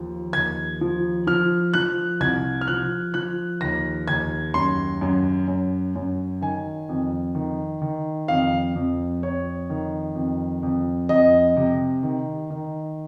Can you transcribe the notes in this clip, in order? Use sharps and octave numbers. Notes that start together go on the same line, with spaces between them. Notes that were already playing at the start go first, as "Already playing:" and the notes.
Already playing: D#2 F3
D#2 G#6
F3
F3 F6
F3 F#6
C2 G#6
F6
F3 F#6
F3 F#6
D#2 A#6
D#2 G#6
F#2 C6
F#2
F#2
F#2
D#3 G#5
F2
D#3
D#3
F2 F5
F2
F2 C#5
D#3
F2
F2
F2 D#5
C3
D#3
D#3